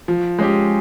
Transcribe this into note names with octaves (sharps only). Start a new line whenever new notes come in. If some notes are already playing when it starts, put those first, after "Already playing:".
F3
G#3 C#4 G4